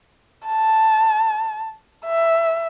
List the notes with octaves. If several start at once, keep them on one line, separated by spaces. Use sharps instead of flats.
A5
E5